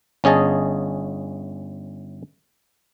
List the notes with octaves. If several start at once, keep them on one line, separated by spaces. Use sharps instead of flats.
G1 C#4 G#4 D#5 A5